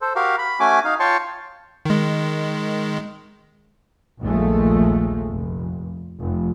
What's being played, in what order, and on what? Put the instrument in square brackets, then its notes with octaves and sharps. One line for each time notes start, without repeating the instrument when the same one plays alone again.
[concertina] A4 C5
F#4 G4 A#4 F5
B5
A3 C#4 F#4 G#5 D6
D#4 F5
F4 C#5 G5 A5 C6 C#6
[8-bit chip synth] D#3 G#3
[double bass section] A#1 D#2 F3 G#3 A3
F1
F1